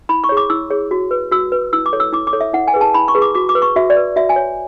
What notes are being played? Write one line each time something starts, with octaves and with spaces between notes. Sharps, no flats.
E4 B5
C#6
G#4 C#5
D6
E4 E6
G#4 C#5
F#4
B4
F#4 E6
B4
E4 E6
D6
A4 C#5
E6
E4 D6
D6
A4 C#5
E5
E4 F#5
G#5
G#4 B4
A5
E4 B5
C#6
G#4 B4
D6
F#4 D6
D6
B4
C#6
F#4 E5
D5
B4
F#4 E5
G#5
C#5